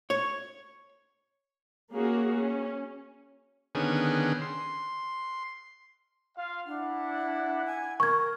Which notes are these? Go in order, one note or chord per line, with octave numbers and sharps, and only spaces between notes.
C#5
A#3 C#4 F#4 G#4
C#4
D3 D#3 B3 C#4 G#4
C6
F4 F5
D4 E4 F#5
G#5
A#4 C#6 G#6